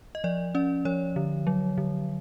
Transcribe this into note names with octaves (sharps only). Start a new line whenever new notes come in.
D#5
F3 D5
C#4 D5
F3 C#5
D3
F#3
D3